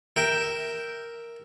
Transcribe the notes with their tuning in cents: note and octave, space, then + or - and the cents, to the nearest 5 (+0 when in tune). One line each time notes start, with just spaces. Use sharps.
A#4 +0 E5 +0 G5 +0